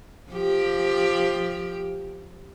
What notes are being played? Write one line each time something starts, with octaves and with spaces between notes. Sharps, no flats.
F3 G4